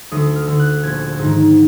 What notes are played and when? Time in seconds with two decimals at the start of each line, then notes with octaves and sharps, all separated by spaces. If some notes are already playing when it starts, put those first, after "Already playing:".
0.11 D2 D#6
0.35 F6
0.47 D3
0.59 F#6
0.83 A#1 G#6
1.19 G#2 D#3